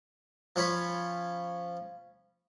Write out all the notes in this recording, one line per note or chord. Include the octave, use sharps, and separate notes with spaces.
F3 C#4 C#5 B5